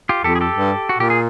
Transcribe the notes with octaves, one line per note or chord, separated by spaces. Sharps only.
F4 G4
F2 G4 A4
G#4
G4 A4
G2
F#4
A#2 G4
G#4